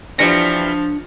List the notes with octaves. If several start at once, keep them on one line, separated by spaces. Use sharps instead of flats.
E3 F3 G3 D4 A#6 C#7